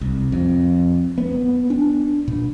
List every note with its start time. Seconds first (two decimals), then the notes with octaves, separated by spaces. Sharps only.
0.01 C2
0.32 F2
1.18 B3
1.70 D4
2.28 A#2